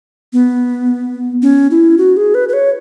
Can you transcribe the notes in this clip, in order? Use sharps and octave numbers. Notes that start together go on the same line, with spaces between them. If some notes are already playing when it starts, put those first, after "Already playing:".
B3
C#4
E4
F#4
G#4
B4
B4
C#5